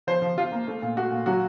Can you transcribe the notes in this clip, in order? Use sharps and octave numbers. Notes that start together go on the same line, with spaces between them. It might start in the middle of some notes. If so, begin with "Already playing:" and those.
F3 C5
F3
F3 F4
A#3
A3
A#2
A3 F#4
A#2
F#3 F#4